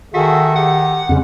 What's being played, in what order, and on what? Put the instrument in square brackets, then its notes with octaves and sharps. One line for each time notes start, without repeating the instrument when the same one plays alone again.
[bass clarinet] D#3 [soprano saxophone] F#4 [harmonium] G#4 A4 E5 [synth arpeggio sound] B6
[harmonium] G4 [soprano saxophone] F#5
[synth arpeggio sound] F2 C#3 [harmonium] G3 G#3 C#4